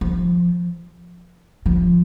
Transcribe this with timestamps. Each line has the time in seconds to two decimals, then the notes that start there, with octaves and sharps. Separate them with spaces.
0.01 F3
1.66 F3